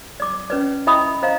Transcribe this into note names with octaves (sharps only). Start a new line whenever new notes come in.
D5 D6
C#4 B4 D5
E4 D#5 E5 G5 B5 D#6
C5 D#5 F5 A#5